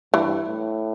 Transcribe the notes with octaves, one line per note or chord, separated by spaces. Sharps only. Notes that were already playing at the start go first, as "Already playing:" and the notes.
G2 E3
A2